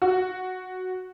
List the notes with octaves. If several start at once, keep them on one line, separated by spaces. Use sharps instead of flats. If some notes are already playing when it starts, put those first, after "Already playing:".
F#4